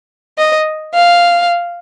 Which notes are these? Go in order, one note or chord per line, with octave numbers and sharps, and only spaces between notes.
D#5
F5